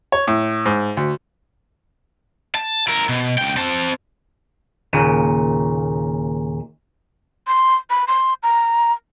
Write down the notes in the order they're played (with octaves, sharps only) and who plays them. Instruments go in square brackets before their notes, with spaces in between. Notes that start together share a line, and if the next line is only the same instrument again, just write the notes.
[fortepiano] C#5
A2
G#2
D2
[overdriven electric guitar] A5
E4 A#4
B2
C#2 G5
C4 A5
[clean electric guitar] D#2 A#2 C#3
[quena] C6
B5
C6
A#5